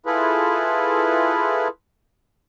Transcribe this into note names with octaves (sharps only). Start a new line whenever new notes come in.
E4 F4 G#4 A4 B4